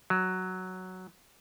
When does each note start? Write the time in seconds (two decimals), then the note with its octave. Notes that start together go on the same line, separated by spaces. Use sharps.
0.10 F#3